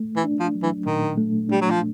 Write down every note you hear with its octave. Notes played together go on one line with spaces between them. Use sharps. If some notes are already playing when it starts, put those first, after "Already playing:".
Already playing: A3
E3
D4
F3
F#3
E3
A#2 D#3
A3
G3 D4
F#3
F3